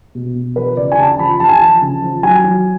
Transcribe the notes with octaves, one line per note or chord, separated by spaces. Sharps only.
B2
B2
F3 B4
C#3 D5
G#5
C#3 A5
A5
F3 B5
F3 A5
G#5
F3 A5
C#3
F3
F#3 G#5
F#3